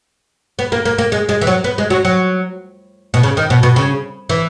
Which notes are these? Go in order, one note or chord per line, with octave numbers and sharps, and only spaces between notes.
B3
A#3
A#3
A#3
G#3
G#3
E3
F#3
B3
G#3
F#3
F#3
B2
C#3
D#3
B2
B2
C#3
E3